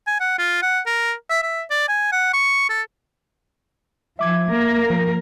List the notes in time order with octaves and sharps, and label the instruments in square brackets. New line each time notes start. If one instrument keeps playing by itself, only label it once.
[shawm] G#5
F#5
F4
F#5
A#4
E5
E5
D5
G#5
F#5
C#6
A4
[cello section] F3 [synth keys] E5 D6 G#6
[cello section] A#3 A#4
[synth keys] F3